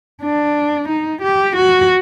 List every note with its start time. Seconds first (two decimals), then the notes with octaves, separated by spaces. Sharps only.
0.23 D4
0.89 D#4
1.22 G4
1.56 F#4